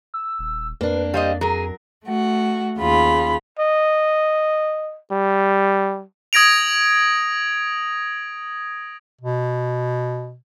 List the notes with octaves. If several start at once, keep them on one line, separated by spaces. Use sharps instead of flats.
E6
D#1
F2 A#3 D4 B4
G3 C5 D#5 F5
F#3 G#4 A#4 A#5
A3 F#4
D#2 C#3 F4 B5
D#5
G3
D#6 G#6 A#6 D7 F7
B2